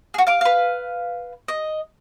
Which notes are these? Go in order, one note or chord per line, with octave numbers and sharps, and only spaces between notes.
F#4 G#4
F5 D6
B4 F5
D#5